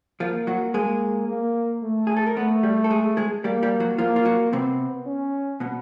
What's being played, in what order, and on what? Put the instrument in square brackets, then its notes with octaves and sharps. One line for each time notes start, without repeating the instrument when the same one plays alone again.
[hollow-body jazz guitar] F3 F4 [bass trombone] A#3
[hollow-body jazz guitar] F#3 F#4
[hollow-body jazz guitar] G#3 G#4 [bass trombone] A#3
[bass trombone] A#3
A3
[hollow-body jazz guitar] G#4
A4
A#4
[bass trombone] A3 [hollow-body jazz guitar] B3 B4
[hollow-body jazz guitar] G3 G4
A4
G#3 G#4
G#3 G#4
[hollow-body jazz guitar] G3 G4 [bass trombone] A#3
[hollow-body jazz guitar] G3 G4
F#3 F#4
[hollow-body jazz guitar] F3 F4 [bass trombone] A#3
[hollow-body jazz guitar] F4
F#3 F#4
[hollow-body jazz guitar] C3 C4 [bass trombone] B3
[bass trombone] C#4
[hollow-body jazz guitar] B2 B3